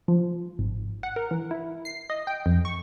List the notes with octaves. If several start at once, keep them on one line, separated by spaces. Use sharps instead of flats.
F3
G#1
F#5
A#4
E3
E4
C7
D#5
G5
F2
C#6